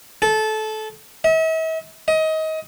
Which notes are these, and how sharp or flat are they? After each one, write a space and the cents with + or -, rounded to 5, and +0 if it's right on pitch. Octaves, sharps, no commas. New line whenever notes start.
A4 -20
E5 -45
D#5 +25